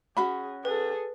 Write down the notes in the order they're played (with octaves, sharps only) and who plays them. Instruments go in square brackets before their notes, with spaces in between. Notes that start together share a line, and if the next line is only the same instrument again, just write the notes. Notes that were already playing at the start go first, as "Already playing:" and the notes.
[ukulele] C#4 F#4 B5 [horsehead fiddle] G#4
[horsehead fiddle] G#4 A4 [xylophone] B4